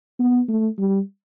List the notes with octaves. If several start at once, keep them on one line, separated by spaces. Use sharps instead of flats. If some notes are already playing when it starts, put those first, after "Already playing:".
B3
A3
G3